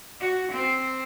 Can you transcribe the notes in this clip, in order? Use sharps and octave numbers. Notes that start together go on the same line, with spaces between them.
F#4
C4